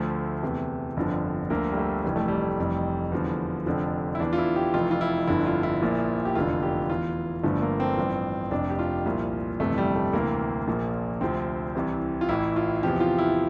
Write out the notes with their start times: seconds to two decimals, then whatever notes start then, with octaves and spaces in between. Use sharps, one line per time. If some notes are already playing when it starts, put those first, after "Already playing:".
Already playing: D2 D3 F3 A3
0.43 E2 C3 E3
0.97 G1 F2 D3 F3
1.50 D2 D3 F3 A#3
1.72 G3
1.77 A3
2.04 F1 F2 E3 G3
2.16 A3
2.28 G3
2.58 F1 F2 E3
3.12 E2 D3 F3
3.66 F1 F2 D3 F3
4.15 E4
4.20 E2 E3 D4
4.33 F4
4.38 E4
4.56 G4
4.74 F1 F2 E3 F4
4.91 F4
5.01 E4
5.27 G1 F2 D3 E4
5.46 F4
5.63 E4
5.82 A#1 A#2 F3
6.25 G4
6.35 F1 E2 D3 F4
6.63 G4
6.90 E2 E3 F4
7.43 G1 G2 D3 F3 A3
7.62 A#3
7.80 C4
7.97 A1 G2 F3
8.51 F1 F2 C3 D4
8.70 G4
8.79 F4
9.06 C2 A#2 F3
9.59 G1 F2 C3 E3 A3
9.78 G3
9.95 A3
10.13 D2 C3 E3 A#3
10.67 A#1 A#2 F3
11.21 D2 C3 F3 C4
11.75 C2 C3 E3
12.21 F4
12.29 A1 A2 E3 E4
12.56 F4
12.83 E2 C3 F3 G4
13.00 F4
13.18 E4